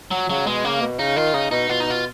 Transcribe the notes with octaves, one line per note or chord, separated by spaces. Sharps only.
F#3
C#3 F#3
B2 G#3
C#3 A#3
B2
C#3 D#4
D#3 F4
C#3 D#4
B2 D#4
B2 F4
D#4
F4